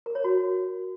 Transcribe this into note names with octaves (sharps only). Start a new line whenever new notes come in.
A#4
C#5
F#4